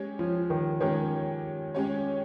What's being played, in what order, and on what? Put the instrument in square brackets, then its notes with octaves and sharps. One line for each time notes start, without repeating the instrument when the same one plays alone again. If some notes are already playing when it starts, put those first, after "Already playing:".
Already playing: [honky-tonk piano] G#3 C#4 G4 C#5
[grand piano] F3
D#3
[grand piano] D#3 [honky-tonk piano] G#3 C#4 G4 C#5
[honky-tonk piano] G#3 C#4 G4 C#5